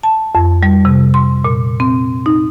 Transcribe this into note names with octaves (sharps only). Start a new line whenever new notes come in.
A5
F2
G3
C3
C6
A#2
C4
D#4